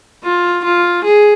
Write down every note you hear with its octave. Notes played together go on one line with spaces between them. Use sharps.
F4
F4
G#4